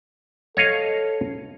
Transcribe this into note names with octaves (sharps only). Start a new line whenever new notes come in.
A4 C#5 D#5 F5